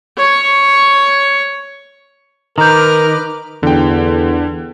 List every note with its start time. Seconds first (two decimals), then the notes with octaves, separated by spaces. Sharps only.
0.17 C#5 C#6
2.58 D#3 A#4 B4 A#5 D6 F6 G6
3.63 E2 D3 G5